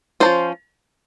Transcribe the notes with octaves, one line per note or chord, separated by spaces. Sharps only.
F3 A#3 C#4 C5